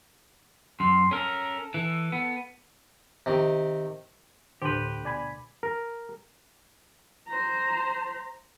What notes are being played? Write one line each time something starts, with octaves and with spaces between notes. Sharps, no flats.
F#2 C6
C#4 A4 A#4
E3 A4
B3
C3 D#3
D2 A2 D3 G4 B4 C5
B2 D5 G#5 B5
A#4
C5 A#5